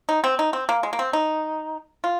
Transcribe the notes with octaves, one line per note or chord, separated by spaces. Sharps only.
D#4
C4
D#4
C4
A#3
G#3
A#3
C4
D#4
F4